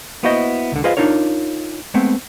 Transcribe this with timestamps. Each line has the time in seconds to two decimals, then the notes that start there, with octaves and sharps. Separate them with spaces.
0.23 A#3 B3 E4 F#4 C5 D#5
0.72 C#2 D3
0.84 F4 G#4 B4 C5 D#5 F5
0.97 D4 D#4 F4 A#4 C#5
1.94 G#3 A3 B3 C4